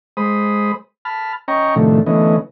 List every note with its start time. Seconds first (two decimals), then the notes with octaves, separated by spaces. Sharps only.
0.17 G#3 C5 B5 D#6
1.05 A5 B5 F6
1.48 C#4 D#5 G5 A#5 C#6
1.76 A2 C3 D#3 F3 A3 D4
2.06 D3 E3 A3 B3 C#4 D#5